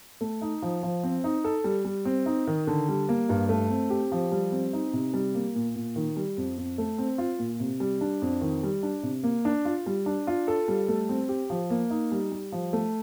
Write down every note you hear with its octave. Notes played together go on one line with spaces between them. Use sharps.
A3
D#4
F3
F3
C4
D#4
A4
G3
G3
C4
D#4
D#3
D3
G3
A#3
G2
A3
C4
G4
F3
G3
C4
D#4
C3
G3
A#3
A#2
A#2
D#3
G3
F2
F2
A3
C4
F4
A#2
C3
G3
D4
F2
D#3
G3
D4
C3
A#3
D4
F4
G3
D4
F4
A4
G3
A3
C4
G4
F3
A#3
D#4
G3
G3
F3
A3